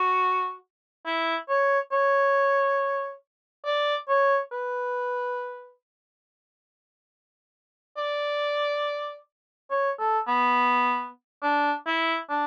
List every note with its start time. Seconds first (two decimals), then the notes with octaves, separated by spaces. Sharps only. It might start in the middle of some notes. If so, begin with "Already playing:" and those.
Already playing: F#4
1.06 E4
1.49 C#5
1.92 C#5
3.66 D5
4.09 C#5
4.52 B4
7.97 D5
9.71 C#5
9.99 A4
10.28 B3
11.43 D4
11.86 E4
12.30 D4